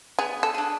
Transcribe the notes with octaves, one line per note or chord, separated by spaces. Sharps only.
B3 G#4
A4
D4 G#4